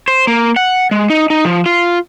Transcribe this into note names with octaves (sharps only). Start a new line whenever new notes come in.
C5
A#3
F#5
G#3
D#4
D#4
F3
F4